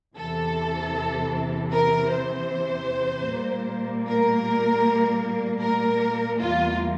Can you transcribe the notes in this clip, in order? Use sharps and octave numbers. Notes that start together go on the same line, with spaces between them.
E2 C3 E3 A4
A#4
C5
A#2 G3 A#3
A#4
A#4
E2 E3 G3 A#3 F4